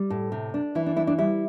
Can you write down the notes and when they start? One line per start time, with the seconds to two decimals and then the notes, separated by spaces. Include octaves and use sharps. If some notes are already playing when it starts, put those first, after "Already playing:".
Already playing: G3
0.10 A2
0.32 C3
0.54 D4
0.75 E3 E4
0.86 D4
0.97 D4 E4
1.07 D4
1.18 G3 E4